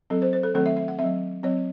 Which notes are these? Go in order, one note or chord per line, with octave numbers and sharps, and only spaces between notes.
F#3 C4 A4
C5
C5
A4
D#3 F#3 A3 C4 A4
E5
E5
F#5
C4 E5
F#3
F#3 C4 C#5